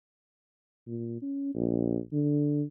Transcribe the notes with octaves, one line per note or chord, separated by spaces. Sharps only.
A#2
C#4
A#1
D3